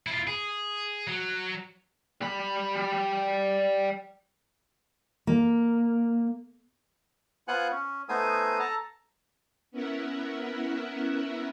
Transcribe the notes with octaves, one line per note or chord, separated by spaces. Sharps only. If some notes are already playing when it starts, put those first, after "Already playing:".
E4 F4
G#4
F#3
G3 B5
A#3
B3 F4 C5 F#5 G#5 F#6
C#4
A3 B3 D#4 C5 G#5 D#6
A4 A5 A#5
B3 C#4 E4 A#4 E5 F#5